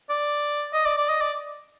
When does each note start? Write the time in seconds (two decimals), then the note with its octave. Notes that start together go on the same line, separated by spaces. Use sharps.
0.10 D5
0.74 D#5
0.86 D5
0.98 D5
1.09 D#5
1.21 D5